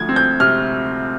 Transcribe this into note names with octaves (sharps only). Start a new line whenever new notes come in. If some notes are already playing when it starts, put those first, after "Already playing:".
Already playing: D2 F3 G#6
C4
G6
C3 F6